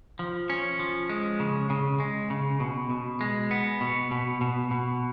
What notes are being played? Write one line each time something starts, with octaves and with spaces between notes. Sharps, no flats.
F3
C#4
F3
G#3
C#3
C#3
G#3
C#3
B2
B2
G#3
B3
B2
B2
B2
B2